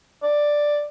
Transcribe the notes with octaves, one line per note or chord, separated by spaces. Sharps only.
D5